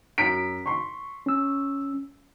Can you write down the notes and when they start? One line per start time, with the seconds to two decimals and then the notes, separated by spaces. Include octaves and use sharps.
0.18 F#2 B6 D7
0.66 C6 C#6
1.26 C#4 E6